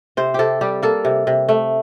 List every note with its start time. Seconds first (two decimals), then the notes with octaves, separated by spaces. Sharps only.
0.17 C3 C5
0.34 C3 G4 A4
0.61 G3 G4
0.83 A#3 A4
1.05 C3
1.27 C3
1.49 A3